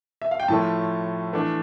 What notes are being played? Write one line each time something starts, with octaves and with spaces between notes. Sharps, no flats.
E5
F5
G5
A2 F3 A3 C#4 A5
E3 A3 D4